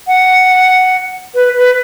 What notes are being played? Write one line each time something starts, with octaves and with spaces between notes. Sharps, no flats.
F#5
B4
B4